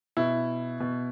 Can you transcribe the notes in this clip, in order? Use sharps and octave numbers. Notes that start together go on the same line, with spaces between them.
B2 E4
B2